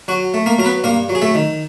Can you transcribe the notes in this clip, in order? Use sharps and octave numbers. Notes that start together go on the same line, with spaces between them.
F#3 F#4
A3
A#3 A#4
F#3 A#4
B3 B4
G2 A#3 A#4
F#3
G#4
A3 A4
D#3